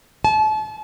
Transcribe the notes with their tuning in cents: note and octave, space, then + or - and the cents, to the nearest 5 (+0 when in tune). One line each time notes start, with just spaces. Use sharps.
A5 -35